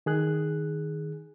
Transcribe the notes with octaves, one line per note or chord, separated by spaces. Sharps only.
D#3 G#4 F#6